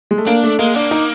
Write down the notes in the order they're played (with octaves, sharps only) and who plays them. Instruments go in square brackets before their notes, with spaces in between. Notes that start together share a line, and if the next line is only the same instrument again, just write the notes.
[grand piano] G#3
A3
[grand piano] A#3 [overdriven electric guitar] D4
[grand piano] A3
[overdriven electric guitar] G#3 [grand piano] A#3
[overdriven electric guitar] A#3 [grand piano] D4
[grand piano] D#4